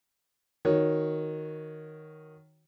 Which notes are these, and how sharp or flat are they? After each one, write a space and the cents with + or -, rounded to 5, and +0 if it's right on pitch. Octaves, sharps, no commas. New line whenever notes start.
D#3 +0 F#4 +0 C#5 +0